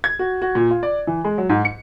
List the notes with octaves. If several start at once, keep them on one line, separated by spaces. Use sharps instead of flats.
G#6
F#4
F#4
A#2
F4
D5
E3
G#3
F#3
G#2
C#7